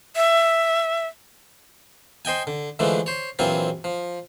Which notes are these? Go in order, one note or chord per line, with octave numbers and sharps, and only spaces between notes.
E5
C5 D#5 G5 G#5
D3
D3 E3 F3 G#3 A3 D4
C5 C#5
A#1 E3 F#3 C4 F4 G#5
F3